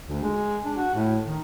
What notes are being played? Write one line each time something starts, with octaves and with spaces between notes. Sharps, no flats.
D2
G#3
D4
F#4
A2
D#3